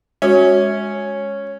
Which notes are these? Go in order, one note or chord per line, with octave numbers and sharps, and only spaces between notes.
G#3 C#4 F#4